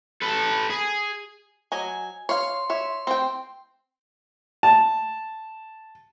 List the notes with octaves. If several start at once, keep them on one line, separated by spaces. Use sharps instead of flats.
A4 B4
G#4
F#3 D#5 G#5
C#5 F5 C6
C#5 E5
C4 G5
A5